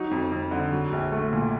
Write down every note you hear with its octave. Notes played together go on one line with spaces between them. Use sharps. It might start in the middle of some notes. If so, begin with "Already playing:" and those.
Already playing: F#3 D#4
F2
F2
D3
F#3
A#1
A3
A#2